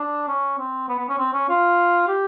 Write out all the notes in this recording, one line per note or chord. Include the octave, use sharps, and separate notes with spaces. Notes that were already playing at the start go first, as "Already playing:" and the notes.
Already playing: D4
C#4
C4
B3
B3
C#4
C4
C#4
F4
G4